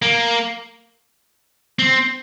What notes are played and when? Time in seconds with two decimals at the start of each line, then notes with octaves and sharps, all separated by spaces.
0.02 A#3
1.79 C4